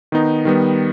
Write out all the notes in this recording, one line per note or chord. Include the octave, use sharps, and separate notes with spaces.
D#3 B3 D#4
D#3 G3 B3